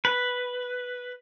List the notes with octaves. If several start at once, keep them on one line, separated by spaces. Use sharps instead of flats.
B4